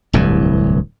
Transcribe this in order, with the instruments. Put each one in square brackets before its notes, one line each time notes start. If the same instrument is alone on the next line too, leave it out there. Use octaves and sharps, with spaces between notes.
[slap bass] D1 C2 G2 E3